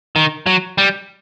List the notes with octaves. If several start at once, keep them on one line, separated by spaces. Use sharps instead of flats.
D#3
F#3
G3